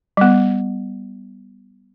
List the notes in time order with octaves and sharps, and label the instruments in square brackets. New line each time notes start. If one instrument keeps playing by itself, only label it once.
[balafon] G3 B3